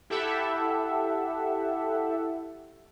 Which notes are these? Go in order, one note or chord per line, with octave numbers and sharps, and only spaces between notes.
E4 G4 A4 E5 F#5